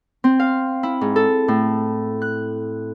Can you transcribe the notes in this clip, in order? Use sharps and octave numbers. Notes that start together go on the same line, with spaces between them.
C4
F5
E4
G#2
A4
A2
F#6